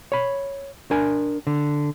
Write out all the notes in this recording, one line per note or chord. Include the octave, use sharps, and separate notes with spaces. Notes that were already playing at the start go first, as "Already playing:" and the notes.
C#5 B5
D4 A#4 G#5
D3